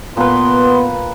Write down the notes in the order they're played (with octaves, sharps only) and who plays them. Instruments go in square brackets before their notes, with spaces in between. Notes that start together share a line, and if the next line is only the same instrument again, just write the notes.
[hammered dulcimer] A#2 B4 [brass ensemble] B3 [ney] C6